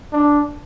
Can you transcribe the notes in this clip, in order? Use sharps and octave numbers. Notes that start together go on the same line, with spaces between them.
D4